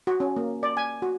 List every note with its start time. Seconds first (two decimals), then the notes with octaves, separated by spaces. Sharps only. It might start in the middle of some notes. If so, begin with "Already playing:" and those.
0.07 F#4
0.20 C#4
0.36 A#3
0.63 D5
0.77 G#5
1.02 F#4